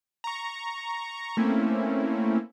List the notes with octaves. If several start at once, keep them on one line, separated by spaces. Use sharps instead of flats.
A#5 C#6
A3 A#3 C4 C#4 E4